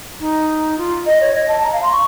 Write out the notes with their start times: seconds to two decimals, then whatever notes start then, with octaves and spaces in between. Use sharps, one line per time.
0.20 D#4
0.78 F4
1.06 D#5
1.21 C#5
1.34 D#5
1.48 A5
1.63 A#5
1.73 F5
1.83 C6
1.92 C#6